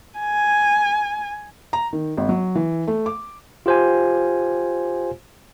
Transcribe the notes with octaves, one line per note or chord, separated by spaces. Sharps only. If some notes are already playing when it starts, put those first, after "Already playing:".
G#5
A#5
D#3
G#1
F#3
E3
A3
D6
F4 G4 C5 F5 G#5